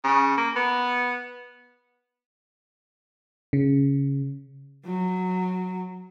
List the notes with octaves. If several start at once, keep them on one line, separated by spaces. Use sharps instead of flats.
C#3
A#3
B3
C#3
F#3